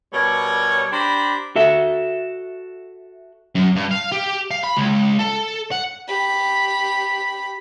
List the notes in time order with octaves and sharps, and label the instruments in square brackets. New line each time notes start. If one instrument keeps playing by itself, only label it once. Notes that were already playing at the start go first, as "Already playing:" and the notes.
[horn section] B2 G3 A#4 C#5
D4 G4 C5 A#5 B5
[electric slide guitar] F#4 A4 E5
[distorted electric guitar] F#2
G2
F5
G4
F5
B5
C#2
A4
F#5
[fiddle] G4 B5